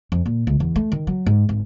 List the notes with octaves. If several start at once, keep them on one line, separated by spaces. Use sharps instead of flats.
F2
A#2
C#2
E2
A3
D#3
F#3
G#2
G#1